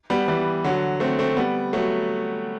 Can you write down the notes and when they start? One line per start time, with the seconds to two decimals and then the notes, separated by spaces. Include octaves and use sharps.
0.10 G3 B3
0.28 E3 G3
0.64 D3 F#3
1.00 A3 C4
1.19 A3 C4
1.37 G3 B3
1.73 F#3 A3